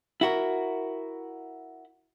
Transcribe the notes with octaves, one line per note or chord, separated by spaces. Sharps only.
E4 F#4 A#4